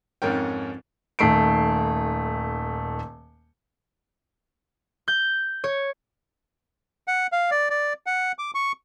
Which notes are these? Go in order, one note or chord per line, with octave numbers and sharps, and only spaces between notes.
F2 G#2 C#4 A#4 G5
D#1 D#3 A3 C7 D7
G6
C#5
F#5
F5
D5
D5
F#5
D6
C#6